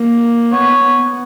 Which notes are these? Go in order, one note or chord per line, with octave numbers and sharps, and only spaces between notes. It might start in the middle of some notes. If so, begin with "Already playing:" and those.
Already playing: A#3
B3 C#5
B3